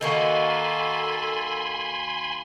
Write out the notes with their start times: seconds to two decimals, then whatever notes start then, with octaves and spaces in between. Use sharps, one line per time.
0.01 D#3 A#3 F#4 A4 G#5 B5 C6